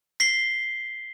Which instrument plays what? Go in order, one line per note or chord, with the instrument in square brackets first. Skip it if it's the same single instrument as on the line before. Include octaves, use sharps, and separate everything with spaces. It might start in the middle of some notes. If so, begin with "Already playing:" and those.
[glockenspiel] B6 C7 G7